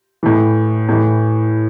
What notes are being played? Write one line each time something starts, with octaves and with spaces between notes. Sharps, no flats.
A2 E3
A2 E3